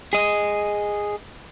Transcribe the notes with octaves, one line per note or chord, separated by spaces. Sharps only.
G#4 D#5